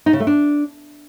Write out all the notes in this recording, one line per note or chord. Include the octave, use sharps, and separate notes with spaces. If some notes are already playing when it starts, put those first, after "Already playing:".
D#4
C#3
A3
D4